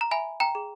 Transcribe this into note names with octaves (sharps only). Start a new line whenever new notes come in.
A#5
E5 G#5 B5
G5 A#5
G#4